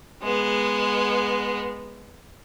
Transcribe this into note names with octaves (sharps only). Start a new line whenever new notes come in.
G#3 B3